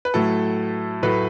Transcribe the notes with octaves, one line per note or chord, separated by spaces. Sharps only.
B4
A2 F#3 A3 A4
A2 F#3 A3 B4